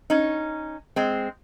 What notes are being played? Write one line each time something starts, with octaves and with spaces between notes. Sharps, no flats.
C#4 D#4
G#3 C4